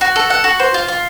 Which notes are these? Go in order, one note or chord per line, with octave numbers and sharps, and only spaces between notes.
F#4
A4
F#5
F#4
C5
F4
F4